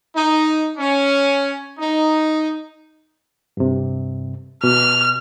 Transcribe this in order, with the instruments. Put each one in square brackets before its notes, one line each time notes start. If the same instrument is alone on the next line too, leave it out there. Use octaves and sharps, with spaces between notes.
[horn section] D#4
C#4
D#4
[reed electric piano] G2 C3
[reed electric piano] B2 [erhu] F6